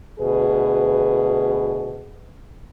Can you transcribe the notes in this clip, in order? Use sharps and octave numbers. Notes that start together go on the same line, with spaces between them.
D2 B2 G#4 B4